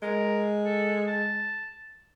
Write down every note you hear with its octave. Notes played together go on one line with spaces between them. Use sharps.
G#3 A#4
A4
A5